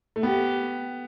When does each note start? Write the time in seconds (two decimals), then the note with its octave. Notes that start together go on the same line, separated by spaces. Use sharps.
0.16 A3
0.23 B3 G4